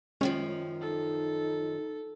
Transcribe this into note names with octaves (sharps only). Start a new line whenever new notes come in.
F#2 D#3 F3 G#3 C#4
D#4 A4